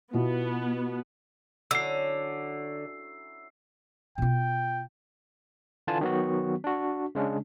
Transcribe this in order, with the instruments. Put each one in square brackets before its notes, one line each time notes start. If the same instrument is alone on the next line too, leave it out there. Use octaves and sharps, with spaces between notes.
[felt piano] B2 E4 F4 [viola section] B3
[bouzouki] D3 [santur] F#3 C#4 E4 [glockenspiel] E6 C7
[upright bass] B2 F4 [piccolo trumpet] G5
[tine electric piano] D3 E3 D4 F4 G#5 A5
D#3 F#3 B3 F#4
D4 F#4
C#3 G#3 C#4 D4